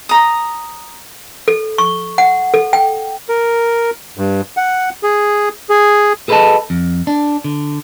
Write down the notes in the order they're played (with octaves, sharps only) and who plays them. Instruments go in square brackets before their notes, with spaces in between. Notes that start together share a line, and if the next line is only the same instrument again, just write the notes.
[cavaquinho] A#5 D#6
[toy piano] A4
C#6
F#5
A4
G5
[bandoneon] A#4
G2
F#5
G#4
G#4
[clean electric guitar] G#4 A4 B4 D5 D#5 A5
F2
D4
D3